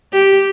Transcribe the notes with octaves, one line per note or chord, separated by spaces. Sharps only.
G4